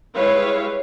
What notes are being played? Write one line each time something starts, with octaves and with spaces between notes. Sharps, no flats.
G3 G#3 E4 B4 C#5 F5